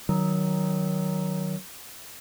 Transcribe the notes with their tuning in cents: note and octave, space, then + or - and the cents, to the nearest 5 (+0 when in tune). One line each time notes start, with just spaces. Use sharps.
D#3 +0 F#3 +15